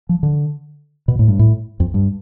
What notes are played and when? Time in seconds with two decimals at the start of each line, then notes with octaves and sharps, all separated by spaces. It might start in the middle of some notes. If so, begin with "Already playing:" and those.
0.09 F3
0.23 D3
1.08 B2
1.19 A2
1.28 G2
1.39 A2
1.80 F2
1.94 G2